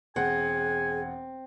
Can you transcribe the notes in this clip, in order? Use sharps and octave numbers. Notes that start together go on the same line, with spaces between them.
E1 C4 G#4 F#5 G#5